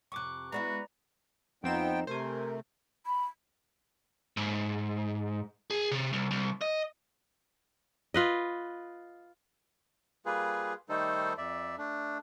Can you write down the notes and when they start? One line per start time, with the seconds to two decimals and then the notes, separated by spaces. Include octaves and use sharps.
0.12 F2 C3 C#6 D6 F#6
0.52 G#3 B3 E4 F#4 B4 D5 A#5
1.64 F2 F3 B3 C4 D#4 G5 E7
2.07 C3 A3 A#4 C5 G#5
3.06 B5
4.37 G#2
5.71 G#4
5.91 C3
6.13 C2
6.31 C2
6.61 D#5
8.14 F4 B4 D#5
10.26 G3 A#3 F4 G#4 B4
10.89 D#3 G3 A3 D#4 A4 C5
11.38 F2 D5 E5
11.78 A3 D4